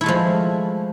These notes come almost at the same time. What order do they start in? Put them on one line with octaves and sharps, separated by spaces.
E4 A3 G#3 F3